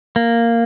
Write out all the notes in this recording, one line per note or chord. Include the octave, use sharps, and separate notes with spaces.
A#3